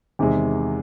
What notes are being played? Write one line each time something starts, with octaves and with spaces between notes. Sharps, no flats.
E2 C3 D#3 G#3